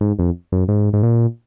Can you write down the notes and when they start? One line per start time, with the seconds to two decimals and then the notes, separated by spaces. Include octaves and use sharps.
0.01 G#2
0.19 F2
0.52 F#2
0.68 G#2
0.93 G#2
1.03 A#2